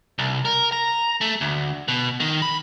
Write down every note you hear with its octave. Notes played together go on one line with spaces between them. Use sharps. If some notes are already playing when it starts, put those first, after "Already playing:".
C2
A#4
A#5
A3
D2
B2
D#3
B5